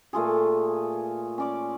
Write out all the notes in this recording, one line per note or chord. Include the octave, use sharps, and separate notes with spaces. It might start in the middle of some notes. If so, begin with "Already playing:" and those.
A#2 A3 F4 G#4
C#4 D5 D6